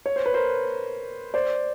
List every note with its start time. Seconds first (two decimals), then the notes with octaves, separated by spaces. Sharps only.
0.06 C#5
0.16 C5
0.26 B4
0.34 A#4 C5
1.34 C5 D5